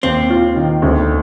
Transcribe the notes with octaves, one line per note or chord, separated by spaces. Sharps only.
D#2 C4
F4
D#3
D2